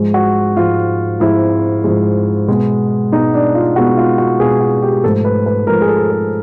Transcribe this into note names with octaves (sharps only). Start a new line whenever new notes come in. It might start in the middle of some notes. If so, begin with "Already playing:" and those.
Already playing: G#2 F3 G#3
F#4
G#2 F3 G#3 F4
G#2 F3 G#3 E4
G#2 F3 G#3
B2 G#3 B3
B2 G#3 B3 D#4
D4
F4
B2 G#3 B3 F#4
F4
F#4
B2 G#3 B3 G#4
F#4
G4
G#2 F3 A3 A4
B4
B4
G#2 F3 A3 A#4
G#4
A4
G#4